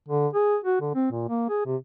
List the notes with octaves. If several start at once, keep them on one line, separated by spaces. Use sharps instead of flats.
D3
G#4
F#4
D3
C4
A#2
A#3
G#4
C3